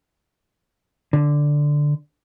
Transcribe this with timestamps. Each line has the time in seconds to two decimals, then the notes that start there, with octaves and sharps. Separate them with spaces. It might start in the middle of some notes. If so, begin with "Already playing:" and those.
1.13 D3